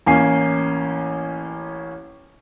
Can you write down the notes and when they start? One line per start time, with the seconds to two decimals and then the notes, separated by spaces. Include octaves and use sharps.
0.06 A1 A#3 C#4 G#5 C7